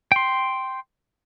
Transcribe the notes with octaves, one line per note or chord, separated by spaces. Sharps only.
G5 C6